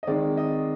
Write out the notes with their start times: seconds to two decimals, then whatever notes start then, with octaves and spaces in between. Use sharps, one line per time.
0.03 D#5
0.07 D#3 G#3 C4 D5
0.37 D#5